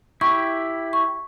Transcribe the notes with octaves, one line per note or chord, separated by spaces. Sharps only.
E4 G4 C#6
C#6